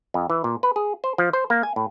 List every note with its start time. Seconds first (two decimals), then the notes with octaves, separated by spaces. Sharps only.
0.14 F2
0.30 E3
0.44 A#2
0.63 B4
0.76 G#4
1.04 C5
1.18 F3
1.33 C5
1.50 A#3
1.63 G#5
1.76 A2